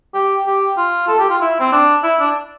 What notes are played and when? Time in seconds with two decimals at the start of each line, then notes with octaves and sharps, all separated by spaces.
0.14 G4
0.47 G4
0.78 F4
1.08 A4
1.19 G4
1.30 F4
1.41 E4
1.60 C4
1.72 D4
2.03 E4
2.20 D4